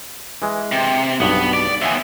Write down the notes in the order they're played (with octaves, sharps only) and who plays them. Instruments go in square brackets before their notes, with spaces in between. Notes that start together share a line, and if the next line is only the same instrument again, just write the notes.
[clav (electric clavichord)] E3 G#3
[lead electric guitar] C3
[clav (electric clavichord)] B1 G2 [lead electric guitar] B3
[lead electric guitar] D5
[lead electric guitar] D#2 B3 [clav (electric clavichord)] E5 G#5